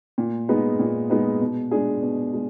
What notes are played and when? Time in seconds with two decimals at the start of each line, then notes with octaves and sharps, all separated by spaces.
0.18 A#2
0.49 G#3 B3 D#4
0.79 A#2
1.09 G#3 B3 D#4
1.41 B2
1.71 G#3 D4 G#4
2.02 B2
2.34 G#3